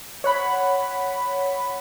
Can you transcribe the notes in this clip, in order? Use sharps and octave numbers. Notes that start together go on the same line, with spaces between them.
C#5 F#5 B5